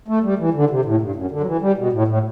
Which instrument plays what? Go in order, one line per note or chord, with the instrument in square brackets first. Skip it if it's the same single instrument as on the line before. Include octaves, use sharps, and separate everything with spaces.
[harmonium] A3
G3
E3
D3
C3
A2
G2
F#2
D3
F#3
E3
G3
B2
A2
A2